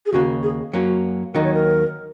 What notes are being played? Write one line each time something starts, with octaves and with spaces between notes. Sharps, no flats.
G#4
D#2 C#3 A#3 F#4
G#4
F#2 F#3 A#3 C#4 F#4
D#2 D#3 F#3 D#4 A#4
C#5
A#4